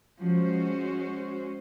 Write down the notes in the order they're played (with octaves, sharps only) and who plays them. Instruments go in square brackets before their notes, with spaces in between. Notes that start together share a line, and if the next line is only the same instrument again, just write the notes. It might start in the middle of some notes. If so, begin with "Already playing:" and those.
[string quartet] F3 [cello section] G#3 C#4 F#4 C5